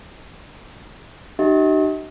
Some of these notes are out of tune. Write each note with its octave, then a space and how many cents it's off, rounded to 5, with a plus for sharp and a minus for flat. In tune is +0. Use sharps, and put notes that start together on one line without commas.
D#4 -40 G4 -45 D#5 +45